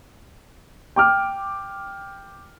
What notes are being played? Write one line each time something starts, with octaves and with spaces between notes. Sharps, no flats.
G5 D6 F6